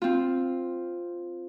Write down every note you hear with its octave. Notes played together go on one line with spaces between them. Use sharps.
C4 F4